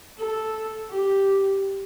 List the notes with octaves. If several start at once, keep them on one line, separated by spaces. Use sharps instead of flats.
A4
G4